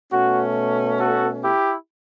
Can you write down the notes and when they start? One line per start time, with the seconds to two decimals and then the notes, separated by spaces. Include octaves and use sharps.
0.12 B2 A3 C#4 F#4
1.00 F#4 A4
1.44 E4 G4